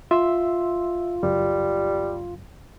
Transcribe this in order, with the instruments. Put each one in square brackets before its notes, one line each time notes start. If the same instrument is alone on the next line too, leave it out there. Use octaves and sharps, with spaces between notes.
[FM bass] F4 [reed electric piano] E5 C6 E6
[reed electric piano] C#2 F#2 [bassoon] G3